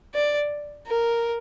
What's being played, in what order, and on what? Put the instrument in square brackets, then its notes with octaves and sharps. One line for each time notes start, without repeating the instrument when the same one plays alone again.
[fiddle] D5
A#4